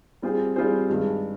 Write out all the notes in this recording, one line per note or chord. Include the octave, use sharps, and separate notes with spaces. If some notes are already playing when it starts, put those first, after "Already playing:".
G3 C4 F4 G#4 C5
G3 C4 F4 G#4 C5
G2 D#3 G#3